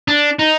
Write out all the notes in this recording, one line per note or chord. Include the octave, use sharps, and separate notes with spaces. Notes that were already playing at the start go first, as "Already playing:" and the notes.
D4
D#4